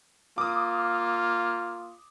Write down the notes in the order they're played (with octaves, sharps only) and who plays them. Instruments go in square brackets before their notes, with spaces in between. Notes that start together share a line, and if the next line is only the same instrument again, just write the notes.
[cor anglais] A#3 [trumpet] F4 [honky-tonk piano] D6 D#6